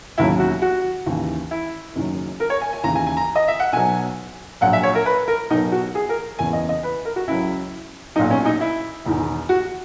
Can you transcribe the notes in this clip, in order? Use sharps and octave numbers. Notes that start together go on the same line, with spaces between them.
E1 D#2 C#3 F#3 E4
F#4
F#4
D#2 C#3 E3
E4
F#1 F#2 D#3 F#3
A#4
C#5
G#5
G#5
D#2 C#3 E3 A#5
G#5
G#5
A#5
D#5
E5
F#5
B1 B2 F#3 G#5
A#1 A#2 F#3 F#5
E5
C#5
A#4
B4
A#4
B1 B2 F#3 D#4
F#4
G#4
A#4
F#1 E2 C#3 E3 G#5
D#5
D#5
B4
A#4
F#4
C#2 C#3 F#3 E4
B1 A#2 F#3 D#4
C#4
D#4
E4
E1 E2 D#3
F#4